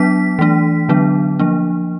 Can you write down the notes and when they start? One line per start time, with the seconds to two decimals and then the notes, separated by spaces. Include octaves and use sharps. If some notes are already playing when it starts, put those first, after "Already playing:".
Already playing: F#3 B3 D4 B6
0.39 E3 A3 D4
0.89 D3 F#3 B3 D4
1.39 F3 A#3 D4